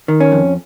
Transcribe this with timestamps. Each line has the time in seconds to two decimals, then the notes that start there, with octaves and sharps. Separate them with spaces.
0.08 D#3
0.20 C#4
0.32 F2